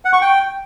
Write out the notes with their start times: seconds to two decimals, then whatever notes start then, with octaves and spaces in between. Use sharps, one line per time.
0.05 F#5
0.13 C#6
0.21 G5